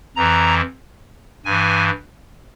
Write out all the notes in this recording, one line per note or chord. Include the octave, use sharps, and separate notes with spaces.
F2 E3 A#5
G2 E3 G#5